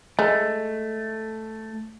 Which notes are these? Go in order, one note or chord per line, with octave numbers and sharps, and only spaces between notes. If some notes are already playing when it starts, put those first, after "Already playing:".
G#3 A3